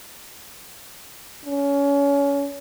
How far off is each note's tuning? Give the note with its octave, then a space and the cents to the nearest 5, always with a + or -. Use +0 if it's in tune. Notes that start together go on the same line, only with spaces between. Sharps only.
C#4 +25